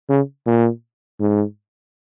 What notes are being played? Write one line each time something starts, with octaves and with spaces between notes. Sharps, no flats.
C#3
A#2
G#2